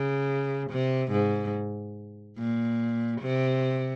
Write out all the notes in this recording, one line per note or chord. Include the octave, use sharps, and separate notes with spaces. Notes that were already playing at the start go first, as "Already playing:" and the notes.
Already playing: C#3
C3
G#2
A#2
C3